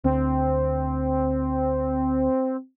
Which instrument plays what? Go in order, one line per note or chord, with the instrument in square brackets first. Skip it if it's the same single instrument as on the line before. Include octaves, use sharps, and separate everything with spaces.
[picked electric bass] D2 [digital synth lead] C4